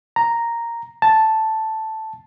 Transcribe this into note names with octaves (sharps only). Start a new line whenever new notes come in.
A#5
A5